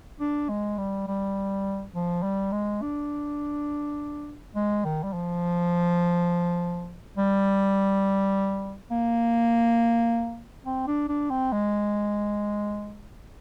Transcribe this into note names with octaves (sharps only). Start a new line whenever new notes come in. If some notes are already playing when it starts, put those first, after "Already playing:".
D4
G#3
G3
G3
F3
G3
G#3
D4
G#3
D#3
G3
F3
G3
A#3
C4
D4
D4
C4
G#3